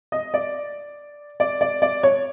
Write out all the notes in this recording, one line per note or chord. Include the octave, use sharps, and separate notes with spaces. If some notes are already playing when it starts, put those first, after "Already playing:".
D#5
D5
D5
D5
D5
C#5